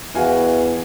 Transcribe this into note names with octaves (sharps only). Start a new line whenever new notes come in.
E2 E3 F#4 F5 G#5